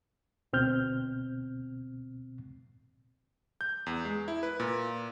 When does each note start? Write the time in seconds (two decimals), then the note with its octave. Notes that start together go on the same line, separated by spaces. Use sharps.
0.53 D2 B2 C4 F6 G6
3.61 G6
3.86 E2
4.05 G#3
4.28 E4
4.43 B4
4.60 A#2